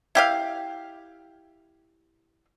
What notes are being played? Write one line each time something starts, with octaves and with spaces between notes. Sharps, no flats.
E4 G4 F5